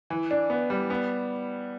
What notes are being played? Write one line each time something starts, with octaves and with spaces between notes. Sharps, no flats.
E3
D4
B3
G3
B3